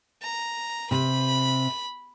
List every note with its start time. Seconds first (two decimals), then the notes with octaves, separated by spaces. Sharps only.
0.22 A#5
0.91 C3 B5